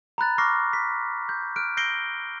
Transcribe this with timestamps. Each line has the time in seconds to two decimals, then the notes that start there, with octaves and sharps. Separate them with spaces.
0.18 A#5 B5 F#6 A6
0.38 C#6 D6 F6 A6 A#6 C7
0.73 B6
1.29 G6
1.56 F6 F#6 D7
1.77 E6 G6 A#6 C7 D7 G7